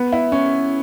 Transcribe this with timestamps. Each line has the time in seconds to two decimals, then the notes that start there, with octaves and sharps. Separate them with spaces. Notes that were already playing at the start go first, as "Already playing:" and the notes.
Already playing: B3
0.13 E4
0.32 C#4